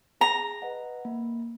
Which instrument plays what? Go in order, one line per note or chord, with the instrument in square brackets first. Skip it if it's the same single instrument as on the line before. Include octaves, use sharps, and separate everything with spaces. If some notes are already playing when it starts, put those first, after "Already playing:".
[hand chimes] G#4 [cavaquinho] A#5
[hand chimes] B4 D#5 F#5
A#3